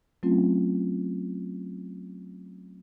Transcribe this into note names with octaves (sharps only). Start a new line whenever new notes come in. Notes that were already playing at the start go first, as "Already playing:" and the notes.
F#3 A3 C4 C#4 F4